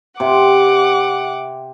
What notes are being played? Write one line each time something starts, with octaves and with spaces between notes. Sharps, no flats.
C3 F#5 D6